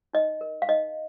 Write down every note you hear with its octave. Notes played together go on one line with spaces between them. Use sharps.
D#4 D#5
A#4
F5
D#4 D#5